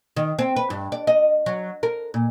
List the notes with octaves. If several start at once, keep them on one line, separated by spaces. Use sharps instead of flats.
D#3
C4
B4
G2
D5
D#5
F#3
A#4
A#2